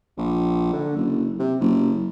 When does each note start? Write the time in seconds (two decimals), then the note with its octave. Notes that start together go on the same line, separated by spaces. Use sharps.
0.18 A#1
0.73 D3
0.96 F#1
1.39 C3
1.60 F#1